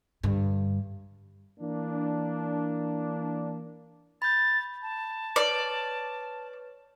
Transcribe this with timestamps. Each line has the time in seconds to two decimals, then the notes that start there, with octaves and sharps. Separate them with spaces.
0.23 G2 D3
1.60 E3 A#3 D4
4.22 B5 G6 A6
4.82 A5
5.36 B4 C#5 D5 F6